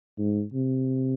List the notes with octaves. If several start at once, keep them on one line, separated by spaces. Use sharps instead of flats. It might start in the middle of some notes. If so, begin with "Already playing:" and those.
G#2
C3